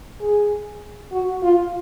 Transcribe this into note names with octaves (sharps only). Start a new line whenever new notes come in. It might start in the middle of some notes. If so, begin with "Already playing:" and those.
G#4
F#4
F4